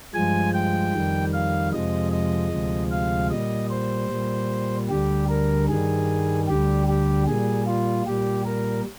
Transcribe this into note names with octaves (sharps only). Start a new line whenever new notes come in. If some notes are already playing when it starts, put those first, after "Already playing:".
G2 F3 G#3 G#5
G5
F2 D#3 G3
F5
F2 C3 F3 G#3 D#5
D#5
D2 C3 F3 G#3
F5
A#2 G3 D#5
C5
A#2 G3
D2 D3 G3 G4
A#4
G2 D#3 G3 G#4
D2 D3 G3 G4
G4
A#2 G3 G#4
F4
A#2 G3 G4
A#4